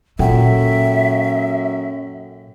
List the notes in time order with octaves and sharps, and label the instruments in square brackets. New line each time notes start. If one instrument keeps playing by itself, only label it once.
[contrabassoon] F#2 [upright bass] A#2 [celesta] A4 F#5 G5 [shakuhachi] E5